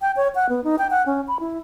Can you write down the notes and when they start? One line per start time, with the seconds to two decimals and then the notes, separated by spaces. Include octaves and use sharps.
0.01 G5
0.16 C#5
0.35 F#5
0.49 B3
0.64 D#4
0.79 G5
0.91 F#5
1.06 C#4
1.28 B5
1.40 E4